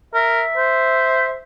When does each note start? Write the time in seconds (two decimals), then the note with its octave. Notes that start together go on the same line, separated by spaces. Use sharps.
0.14 A#4 E5
0.56 C5